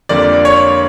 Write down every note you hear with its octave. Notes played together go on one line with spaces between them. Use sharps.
F2 D3 G3 A#3 D5
C#5